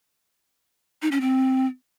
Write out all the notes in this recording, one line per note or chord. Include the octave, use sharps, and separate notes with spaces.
D#4
C#4
C4